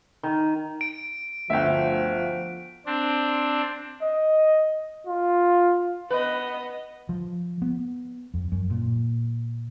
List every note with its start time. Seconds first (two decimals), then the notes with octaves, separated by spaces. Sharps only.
0.23 D#3
0.81 D7
1.50 G1 D2 F3 E5 G5
2.86 C4 D4
4.02 D#5
5.07 F4
6.10 B3 B4 D#5
7.09 F3
7.62 B3
8.34 F2
8.52 F#2
8.70 A#2